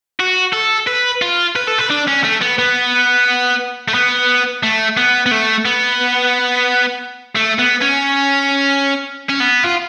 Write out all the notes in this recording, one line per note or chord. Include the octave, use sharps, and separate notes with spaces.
F#4
A4
B4
F4
B4
A4
B4
D4
C#4
A3
B3
B3
A3
B3
A3
B3
B3
A3
B3
A3
B3
C#4
C#4
B3
F4